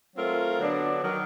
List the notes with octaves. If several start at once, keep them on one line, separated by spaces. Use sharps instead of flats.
F#3 A3 C4 F4 A#4
D3 F#3 B3 D4
D#3 F#3